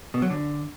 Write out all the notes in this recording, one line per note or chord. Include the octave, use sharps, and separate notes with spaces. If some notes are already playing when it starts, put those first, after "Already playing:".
B2
F#3
D3